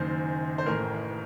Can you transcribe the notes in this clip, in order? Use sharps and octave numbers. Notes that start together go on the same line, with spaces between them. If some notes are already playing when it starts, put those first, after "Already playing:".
Already playing: F#1 F#2 D#3 C5
C5
A1 A2 A#4